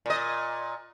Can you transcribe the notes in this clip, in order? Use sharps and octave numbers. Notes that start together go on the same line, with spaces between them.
A#2 D#5